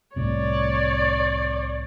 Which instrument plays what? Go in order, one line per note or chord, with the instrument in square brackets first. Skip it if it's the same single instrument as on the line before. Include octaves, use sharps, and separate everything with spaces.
[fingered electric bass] C2 A2 C3 [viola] C#5 D5